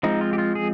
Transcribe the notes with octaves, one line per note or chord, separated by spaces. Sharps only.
F3 G#3 C4 D#4
F4
G4
F4
G#4